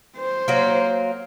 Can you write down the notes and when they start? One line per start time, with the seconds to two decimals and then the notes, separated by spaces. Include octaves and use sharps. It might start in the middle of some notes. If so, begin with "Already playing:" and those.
0.17 C5
0.48 F#3 A#3